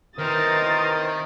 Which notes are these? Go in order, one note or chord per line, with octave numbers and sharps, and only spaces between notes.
C3 D#3 E3 A#4 C5 D#6 A6